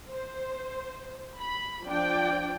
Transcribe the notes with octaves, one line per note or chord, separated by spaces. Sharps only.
C5
B5
F3 D4 D5 G5